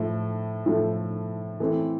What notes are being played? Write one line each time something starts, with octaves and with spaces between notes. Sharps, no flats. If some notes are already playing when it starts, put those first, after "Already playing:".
Already playing: A2 F3 A3
A2 F3 A3
E3 A3 C4